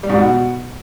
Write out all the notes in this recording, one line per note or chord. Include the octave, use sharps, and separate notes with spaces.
G3
G#2
B2